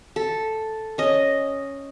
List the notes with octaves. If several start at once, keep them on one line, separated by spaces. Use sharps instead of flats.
A4
C#4 D#5